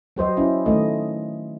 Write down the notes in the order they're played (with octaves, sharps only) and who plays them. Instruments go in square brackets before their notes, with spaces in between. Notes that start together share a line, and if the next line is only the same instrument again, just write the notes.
[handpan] F#3 G4 C5 D#5
C#4 E4
D#3 A3 D#5